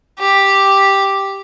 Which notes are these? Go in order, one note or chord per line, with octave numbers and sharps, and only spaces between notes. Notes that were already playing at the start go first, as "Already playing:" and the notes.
G4